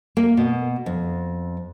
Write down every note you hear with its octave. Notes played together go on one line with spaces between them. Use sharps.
A#3
B2
F2